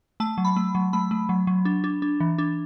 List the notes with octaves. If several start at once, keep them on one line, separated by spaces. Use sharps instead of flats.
A3 A5
F#3
B5
A3
F#3
A3 B5
A3
F#3
F#3
D4
D4
D4
E3
D4